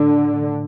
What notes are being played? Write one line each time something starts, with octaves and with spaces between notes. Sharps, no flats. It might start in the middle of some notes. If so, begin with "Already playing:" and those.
Already playing: A2 D3